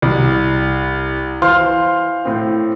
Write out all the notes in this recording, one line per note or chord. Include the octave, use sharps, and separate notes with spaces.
C2
E3 C5 F5 C6 F6
A2 C4